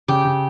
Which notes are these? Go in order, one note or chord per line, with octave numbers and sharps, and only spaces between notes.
C#3 G4
C#3